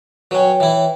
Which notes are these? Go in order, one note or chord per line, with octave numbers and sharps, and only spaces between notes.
F#3 C#4 B4 C#5 G5
E3 E4